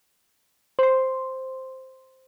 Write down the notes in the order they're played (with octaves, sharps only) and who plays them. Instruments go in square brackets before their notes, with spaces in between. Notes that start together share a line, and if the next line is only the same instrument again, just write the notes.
[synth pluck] C5 C6